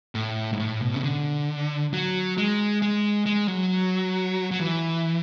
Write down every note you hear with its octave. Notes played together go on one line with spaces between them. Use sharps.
A2
G#2
A2
B2
C#3
D3
F#3
G#3
G#3
G#3
F#3
F#3
E3